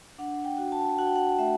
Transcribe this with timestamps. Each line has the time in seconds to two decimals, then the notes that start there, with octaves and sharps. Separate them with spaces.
0.18 D4 F#5
0.45 G5
0.58 F#4
0.72 A5
0.98 F#4 F#5
1.07 G5
1.16 F#5
1.38 A3 E5